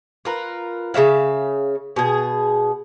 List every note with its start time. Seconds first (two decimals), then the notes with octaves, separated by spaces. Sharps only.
0.25 F4 A#4 B4
0.94 C#3 C4 E5 F5
1.96 B2 G#4